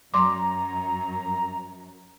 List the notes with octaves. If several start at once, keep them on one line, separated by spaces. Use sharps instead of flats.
F#2 F#3 A#5 C6 D6